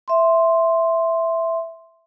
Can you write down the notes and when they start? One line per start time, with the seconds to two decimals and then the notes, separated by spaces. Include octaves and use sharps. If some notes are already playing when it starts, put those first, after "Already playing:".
0.08 E5 C6